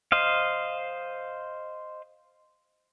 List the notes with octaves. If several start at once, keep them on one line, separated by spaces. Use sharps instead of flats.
C5 D#5 F5